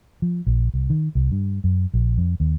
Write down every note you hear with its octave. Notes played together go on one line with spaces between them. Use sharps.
F3
A#1
C2
D#3
C2
G2
F#2
A#1
F2
D#2